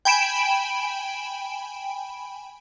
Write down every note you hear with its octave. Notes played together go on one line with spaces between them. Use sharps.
G5 G#5 B5 D7 E7